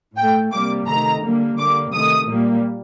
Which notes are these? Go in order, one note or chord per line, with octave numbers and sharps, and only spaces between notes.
A2 A3 G5
C3 G3 A#3 D6
C3 D#3 A3 A#5
D3 G3 A#3
D3 G3 A#3 D6
C3 D#3 A3 D#6
A#2 G3 A#3